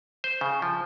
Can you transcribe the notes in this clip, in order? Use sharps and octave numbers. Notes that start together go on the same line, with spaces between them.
C5
C#3
F3